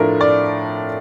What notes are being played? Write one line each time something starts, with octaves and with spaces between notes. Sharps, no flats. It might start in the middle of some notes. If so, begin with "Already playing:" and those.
Already playing: A2 F3 A3 D4 F4 A#4
D5